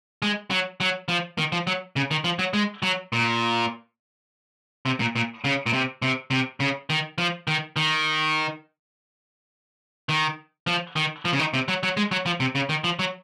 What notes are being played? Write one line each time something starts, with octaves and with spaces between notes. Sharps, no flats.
G#3
F#3
F#3
F3
D#3
F3
F#3
C#3
D#3
F3
F#3
G#3
F#3
A#2
C3
A#2
A#2
C#3
A#2
C3
C3
C3
C#3
D#3
F3
D#3
D#3
D#3
F3
D#3
F3
C#3
D#3
C3
F#3
F#3
G#3
F#3
F3
C3
C#3
D#3
F3
F#3